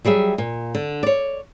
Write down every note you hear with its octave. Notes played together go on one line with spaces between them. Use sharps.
F#3 G3 G#4 E5
A#2
D3
C#5 D5